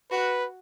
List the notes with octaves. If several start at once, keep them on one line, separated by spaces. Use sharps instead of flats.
F#4 B4